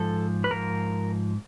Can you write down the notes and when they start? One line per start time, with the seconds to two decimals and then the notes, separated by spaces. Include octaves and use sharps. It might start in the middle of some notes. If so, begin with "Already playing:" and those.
Already playing: G#2 F3 A4
0.44 B4
0.51 G#2 F3 A#4